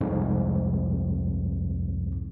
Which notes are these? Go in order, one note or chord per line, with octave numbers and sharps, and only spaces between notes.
C2 F2 G#2